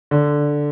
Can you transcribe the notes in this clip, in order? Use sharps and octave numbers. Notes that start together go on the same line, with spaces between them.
D3